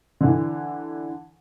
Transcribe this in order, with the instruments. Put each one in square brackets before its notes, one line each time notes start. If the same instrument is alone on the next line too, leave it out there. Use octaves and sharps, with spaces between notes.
[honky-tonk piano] D3 E3